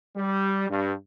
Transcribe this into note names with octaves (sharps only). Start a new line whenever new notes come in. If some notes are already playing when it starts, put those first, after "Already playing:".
G3
G2